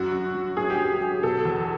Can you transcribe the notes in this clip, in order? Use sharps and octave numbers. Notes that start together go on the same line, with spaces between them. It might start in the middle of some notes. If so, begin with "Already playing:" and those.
Already playing: F#2 F#4
F#2
F#3
A2 G#4
G4
F#3
G#4
F#3
B2 A4
E2